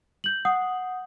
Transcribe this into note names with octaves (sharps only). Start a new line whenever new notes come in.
G6 F#7
F#5 D#6